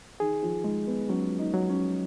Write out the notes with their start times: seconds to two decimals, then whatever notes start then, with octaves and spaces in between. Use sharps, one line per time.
0.20 D#3 G#4
0.42 F3
0.64 G#3 D#4
0.87 B3
1.09 F#3 C#4
1.39 D#4
1.54 F#3
1.69 C#4